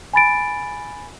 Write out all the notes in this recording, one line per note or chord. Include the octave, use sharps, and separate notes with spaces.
G#5 B5 A6 D7